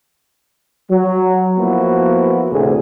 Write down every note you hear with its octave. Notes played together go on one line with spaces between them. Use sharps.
F#3
F3 A#3 B3 E4 F#4
A1 D2 A2 C3 G#4